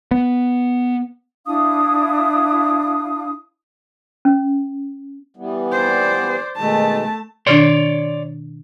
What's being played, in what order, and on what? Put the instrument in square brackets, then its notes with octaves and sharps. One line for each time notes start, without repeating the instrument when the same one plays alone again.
[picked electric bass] B3
[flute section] D4 E4 F5 D#6
[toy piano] C#4
[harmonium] E3 G3 B3
[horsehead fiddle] C5 D5
[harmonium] B2 D#3 G#3 [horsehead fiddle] A3 A5
[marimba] B2 D#3 D4 [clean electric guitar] C#5 D5 C6